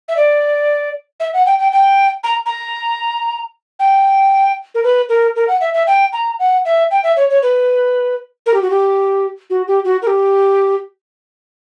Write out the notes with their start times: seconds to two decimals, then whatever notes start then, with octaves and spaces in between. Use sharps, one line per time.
0.08 E5
0.17 D5
1.20 E5
1.34 F#5
1.46 G5
1.59 G5
1.72 G5
2.23 A#5
2.46 A#5
3.79 G5
4.75 A#4
4.83 B4
5.09 A#4
5.36 A#4
5.48 F#5
5.61 E5
5.74 E5
5.87 G5
6.13 A#5
6.39 F#5
6.65 E5
6.91 G5
7.03 E5
7.16 C#5
7.30 C#5
7.42 B4
8.46 A#4
8.54 G4
8.62 F#4
8.70 G4
9.50 F#4
9.67 G4
9.84 F#4
10.02 A#4
10.07 G4